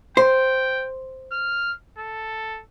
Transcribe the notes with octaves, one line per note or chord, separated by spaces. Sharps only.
C5 G5
F6
A4